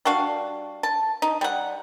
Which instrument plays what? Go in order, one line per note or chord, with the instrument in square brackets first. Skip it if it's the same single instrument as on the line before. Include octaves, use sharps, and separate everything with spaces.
[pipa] G3 D4 F#4 F5
A5
D#4
G3 F#5